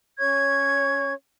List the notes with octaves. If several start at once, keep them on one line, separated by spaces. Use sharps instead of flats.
C#4 C#5 C#6 G#6